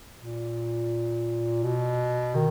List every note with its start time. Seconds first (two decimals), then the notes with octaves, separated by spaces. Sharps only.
0.21 A#2
1.63 B2
2.35 D#3